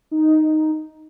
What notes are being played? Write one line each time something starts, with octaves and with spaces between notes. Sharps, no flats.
D#4